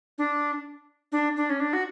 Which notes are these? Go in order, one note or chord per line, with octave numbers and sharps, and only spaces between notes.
D4
D4
D4
C#4
D4
F#4